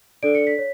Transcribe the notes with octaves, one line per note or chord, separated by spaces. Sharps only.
D4 A4 D5 D7
C#7
B6
C#5